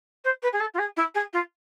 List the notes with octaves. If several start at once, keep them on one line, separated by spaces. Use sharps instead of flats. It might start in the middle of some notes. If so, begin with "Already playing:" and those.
C5
B4
G#4
A4
F4
G#4
E4
G#4
F4